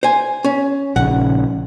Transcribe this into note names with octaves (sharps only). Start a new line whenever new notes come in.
C5 G#5
C#4
A#1 C#3 F#5